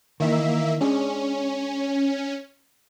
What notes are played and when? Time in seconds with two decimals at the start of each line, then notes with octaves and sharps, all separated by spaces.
0.20 D#3 E3 A#3 D#4 E5
0.81 G#3 C#4 D4 G#4